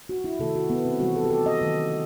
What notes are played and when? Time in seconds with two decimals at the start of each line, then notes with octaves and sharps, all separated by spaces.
0.09 F#4
0.24 E4
0.39 C3 D#3 A3 A4
0.56 F#4
0.70 B3
0.85 C4
1.00 C3 E3 G3 F#4
1.16 A4
1.24 G4
1.30 A4
1.46 D#5
1.61 D#3 F#3 A3